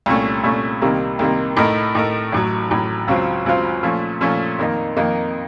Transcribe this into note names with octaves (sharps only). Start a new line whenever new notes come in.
C2 A#2 A3 C#4
C2 A#2 A3 C#4
C2 C3 D#3 A#3
C2 C3 D#3 A#3
A2 A3 D#4 A#4
A2 A3 D#4 A#4
A1 A2 F#3
A1 A2 F#3
C#2 C#3 F#3 C4 F4
C#2 C#3 F#3 C4 F4
A#2 F3 A3 C#4
A#2 F3 A3 C#4
F2 D#3 A#3 D#4
F2 D#3 A#3 D#4